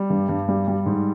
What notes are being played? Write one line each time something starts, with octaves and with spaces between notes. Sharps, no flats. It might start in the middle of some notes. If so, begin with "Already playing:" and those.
Already playing: G3
G2
G2
G3
G3
G#2